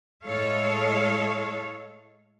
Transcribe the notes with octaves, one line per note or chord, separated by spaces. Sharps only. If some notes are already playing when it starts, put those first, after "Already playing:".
A2 G#3 A4 C#5 F5